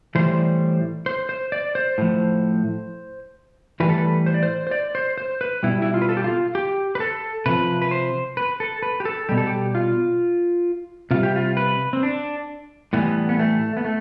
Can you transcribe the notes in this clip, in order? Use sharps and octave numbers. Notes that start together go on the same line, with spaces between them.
A2 E3 G3 C5
C5
C5
D5
C5
A2 F3
A2 E3 G3 B4
A4
B4
C5
D5
C5
C5
D5
C5
C5
B4
B2 G3 E4
E4
F4
B4
A4
G4
F4
G4
B4
A4
C3 F3 B4
B4
C5
B4
A4
B4
G4
A4
B2 G3 G4
A4
G4
F4
C3 G3 F4
G4
F4
B4
C4
D4
A2 E3 G3 B3
B3
A3
B3
A3